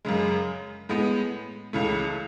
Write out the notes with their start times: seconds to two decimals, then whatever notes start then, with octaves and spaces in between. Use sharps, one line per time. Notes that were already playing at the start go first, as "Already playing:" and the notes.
0.05 F#2 C#3 G#3
0.89 A2 G#3 B3
1.73 C#2 C#3 E3 A3